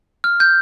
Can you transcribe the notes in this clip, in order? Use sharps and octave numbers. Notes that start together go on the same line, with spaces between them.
F6
G6